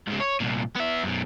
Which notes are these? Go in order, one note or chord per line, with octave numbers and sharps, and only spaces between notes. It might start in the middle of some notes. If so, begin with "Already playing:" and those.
G#2 C#3
C#5
C2 A#2
B3 E5
F#2 B2